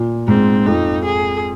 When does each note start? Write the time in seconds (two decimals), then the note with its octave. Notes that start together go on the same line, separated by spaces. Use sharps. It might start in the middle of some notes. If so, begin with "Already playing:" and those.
Already playing: A#2
0.28 G#2 C4
0.66 F2 D#4
1.06 G#4